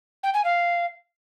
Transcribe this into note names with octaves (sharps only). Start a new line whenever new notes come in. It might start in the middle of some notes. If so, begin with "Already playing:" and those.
G5
G#5
F5